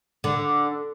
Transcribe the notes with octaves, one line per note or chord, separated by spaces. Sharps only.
D3